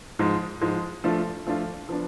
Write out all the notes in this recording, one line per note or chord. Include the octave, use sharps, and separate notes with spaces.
G#2 F3 G#3
G#2 F3 G#3
F3 A3 D4 F4
F3 A3 D4 F4
F3 B3 D4